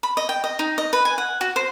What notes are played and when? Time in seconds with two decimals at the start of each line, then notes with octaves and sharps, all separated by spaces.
0.03 B5
0.17 D#5
0.29 G5
0.44 D#5
0.59 D#4
0.78 D#5
0.93 B4
1.05 G#5
1.18 F#5
1.41 F#4
1.56 C5